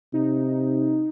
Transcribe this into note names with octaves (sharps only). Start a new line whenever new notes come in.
C3 D#4